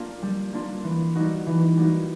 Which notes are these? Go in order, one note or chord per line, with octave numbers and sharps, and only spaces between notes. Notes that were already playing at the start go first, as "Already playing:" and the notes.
Already playing: A#3 D4 F4
G3
A#3 D4 F4
E3
G3 A#3 D#4 F#4
E3
G3 A#3 D#4 F#4